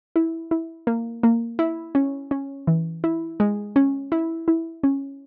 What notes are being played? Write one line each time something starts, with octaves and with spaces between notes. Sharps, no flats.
E4
E4
A#3
A#3
E4
C#4
C#4
E3
E4
G#3
C#4
E4
E4
C#4